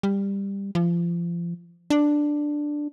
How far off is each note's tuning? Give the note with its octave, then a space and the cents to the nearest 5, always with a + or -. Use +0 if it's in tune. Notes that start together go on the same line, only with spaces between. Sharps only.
G3 +15
F3 -30
D4 +5